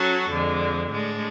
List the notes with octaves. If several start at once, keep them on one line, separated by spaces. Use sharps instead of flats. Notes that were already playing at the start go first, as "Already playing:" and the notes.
Already playing: F#3 C#4 F#4 A4
F2 D3 G#3
A2 G#3 D4